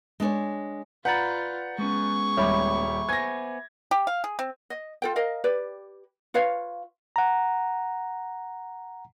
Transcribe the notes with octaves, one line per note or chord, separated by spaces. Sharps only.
G#3 D4 G#4 C#5
F4 B4 D5 F#5 A#5 B5 G6 A6
G#3 B3 C#4 G#4 C#6
D#1 G3 C#5 E5 B5 D6
B3 C5 G#5 G#6 A#6
G4
F5
G#4
C4
D#5
F4 A4 G5
A#4 D#5 F5
G4 B4 D5
F4 B4 C#5 F5
F#5 A#5